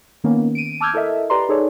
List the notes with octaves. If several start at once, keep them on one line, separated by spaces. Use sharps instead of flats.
D#3 A#3 B3 C#4
D7 D#7
A5 D6 E6 F6 G6 G#6
E4 A4 A#4 D#5 E5
G4 B4 D5 A#5 C6
D#4 G#4 A4 C#5 D5